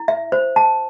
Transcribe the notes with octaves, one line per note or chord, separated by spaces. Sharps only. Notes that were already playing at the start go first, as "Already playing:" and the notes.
Already playing: E4
E5
C5
A5